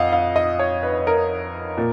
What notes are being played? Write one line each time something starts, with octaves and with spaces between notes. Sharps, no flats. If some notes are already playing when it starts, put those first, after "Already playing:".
Already playing: F2 D#5 F5 F#5
F5
D#5
C#5
B4
A#4
A#2